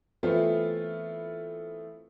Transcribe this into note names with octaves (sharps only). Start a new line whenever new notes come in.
E3 A3 B3 C4 F4